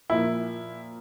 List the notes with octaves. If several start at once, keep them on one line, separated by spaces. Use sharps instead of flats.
A#2 F3 A#3 E4